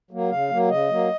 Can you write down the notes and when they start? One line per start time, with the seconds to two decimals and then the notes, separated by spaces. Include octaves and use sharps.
0.11 F#3 A#3
0.30 C#3 F5
0.50 F#3 A#3
0.69 C#3 D#5
0.89 F#3 A#3